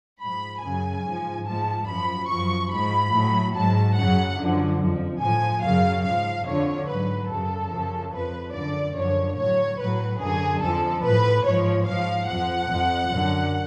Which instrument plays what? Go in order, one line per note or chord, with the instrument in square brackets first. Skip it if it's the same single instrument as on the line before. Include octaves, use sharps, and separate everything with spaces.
[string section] G#2 F3 B5
F#2 C#3 F#3 G#5
G#2 F3
G#2 F3 A5
F#2 F3 B5
F#2 F3 C#6
G#2 F3 B5
A2 F#3
G#2 F#3 A5
F#2 C#3 F#3 F#5
F#2 D3 F3
F2 F3
A2 F3 G#5
F#2 C#3 F#3 F5
G#2 F3 F5
F2 D3 F3 C#5
G#2 F#3 B4
F#2 C#3 F#3 A4
F#2 C#3 F3
F2 F3 B4
F#2 D3 F3 D5
F#2 D3 F3 C#5
A2 F#3 C#5
A2 F#3 B4
F#2 D3 F#3 G#4
F2 F3 A4
A2 F3 B4
G#2 F3 C#5
G#2 F3 F5
F2 F3 F#5
F2 F3
F#2 D3 F#3